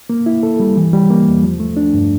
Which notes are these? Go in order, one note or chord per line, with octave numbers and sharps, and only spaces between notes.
A#3
E4
A4
G3
E3
G3
A#3
E2
F3
A3
D4
G2